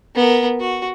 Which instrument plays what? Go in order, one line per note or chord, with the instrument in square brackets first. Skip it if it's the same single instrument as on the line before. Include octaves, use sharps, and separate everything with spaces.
[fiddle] B3 A#4
F#4